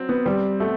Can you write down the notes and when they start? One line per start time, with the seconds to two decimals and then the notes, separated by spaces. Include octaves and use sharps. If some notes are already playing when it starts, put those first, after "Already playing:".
Already playing: F#3 C4
0.09 B3
0.25 G3 C4
0.60 B2 A3